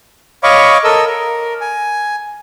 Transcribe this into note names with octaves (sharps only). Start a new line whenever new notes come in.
C#5 D#5 F5 B5 C#6 D6
A4 A#4 D#5 E6
A#4
G#5